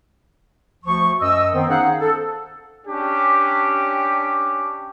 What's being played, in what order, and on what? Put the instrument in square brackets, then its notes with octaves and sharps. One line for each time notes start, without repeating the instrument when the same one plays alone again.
[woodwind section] D2 F3 C#6
F#2 D#5 E6
D#3 B3 C4
C#4 D#4 G#4 C5 F5 F#5
A4
[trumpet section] C#4 D4 G4